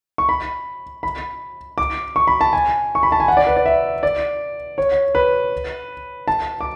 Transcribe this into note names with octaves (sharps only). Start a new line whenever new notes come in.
C#6
B5
B5
D6
C#6
B5
A5
G#5
C#6
B5
A5
G#5
F#5
D5
B4
D5
E5
D5
C#5
B4
A5
D6